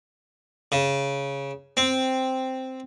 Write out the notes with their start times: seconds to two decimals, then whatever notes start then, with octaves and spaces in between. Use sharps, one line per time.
0.72 C#3
1.77 C4